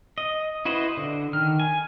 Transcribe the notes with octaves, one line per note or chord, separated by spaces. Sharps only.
D#5
E4 F#4 B4 C5 D#5
D3
D#3 F6
G#5